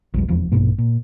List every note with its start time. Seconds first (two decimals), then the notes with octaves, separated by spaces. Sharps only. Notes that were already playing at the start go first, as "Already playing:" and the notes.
0.14 A#1 E2 G3
0.29 F1 E2 F3
0.52 A#1 G2 B2 A#3
0.78 A#2